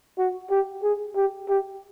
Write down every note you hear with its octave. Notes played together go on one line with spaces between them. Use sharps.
F#4
G4
G#4
G4
G4